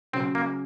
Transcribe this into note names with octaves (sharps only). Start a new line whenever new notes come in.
C#3 F#3 C4 C#4
A#3